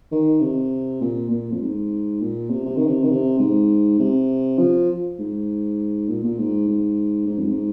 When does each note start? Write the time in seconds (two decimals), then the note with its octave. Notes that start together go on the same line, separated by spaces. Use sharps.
0.11 D#3
0.41 C3
1.01 A#2
1.30 A#2
1.52 F2
1.61 G#2
2.20 A#2
2.50 C3
2.65 C3
2.76 D#3
2.86 C3
3.03 D#3
3.10 C3
3.39 G#2
3.99 C3
4.58 F3
5.19 G#2
6.08 A#2
6.24 A#2
6.38 G#2
6.68 G#2
7.27 G#2
7.38 F2
7.47 G#2